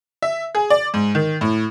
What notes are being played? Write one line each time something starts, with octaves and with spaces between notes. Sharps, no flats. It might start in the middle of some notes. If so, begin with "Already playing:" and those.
E5
G#4
D5
G#2
D#3
A2